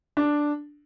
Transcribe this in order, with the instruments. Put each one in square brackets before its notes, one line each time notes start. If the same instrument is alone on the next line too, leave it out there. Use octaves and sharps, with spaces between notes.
[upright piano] D4